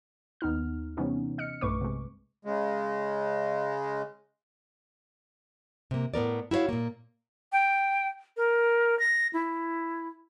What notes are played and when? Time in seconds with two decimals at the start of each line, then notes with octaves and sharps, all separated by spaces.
0.41 D#2 B3 D#4 F6
0.97 C3 E3 G3 B3 C#4 D#4
1.38 D#5 F6 C#7
1.61 B1 G2 A3 B4 C#6 D6
1.81 C3 G#3
2.45 C#3 G#3
5.91 C3 A#3
6.14 A2 B3 A#4 D5
6.51 E4 F#4 A#4 C#5 F5
6.69 A#2 A#3
7.52 G5
8.37 A#4
8.99 A#6
9.33 E4